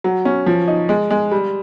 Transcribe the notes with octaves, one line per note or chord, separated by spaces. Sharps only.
F#3
C#4
F3
D#4
G#3
G#3
G3